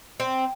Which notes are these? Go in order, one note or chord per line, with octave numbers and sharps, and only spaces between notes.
C4